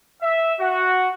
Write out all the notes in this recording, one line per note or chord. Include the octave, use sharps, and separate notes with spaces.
E5
F#4